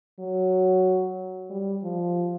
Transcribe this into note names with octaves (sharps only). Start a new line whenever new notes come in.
F#3
G3
F3